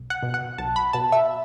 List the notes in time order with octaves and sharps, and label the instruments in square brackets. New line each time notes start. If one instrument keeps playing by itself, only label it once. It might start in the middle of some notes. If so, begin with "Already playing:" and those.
Already playing: [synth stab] B1
F#5
B2
F#5
B1 A5
B5
B2 A5
E5